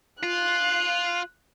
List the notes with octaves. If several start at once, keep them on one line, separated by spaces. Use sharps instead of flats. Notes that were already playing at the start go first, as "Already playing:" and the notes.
F4 F#6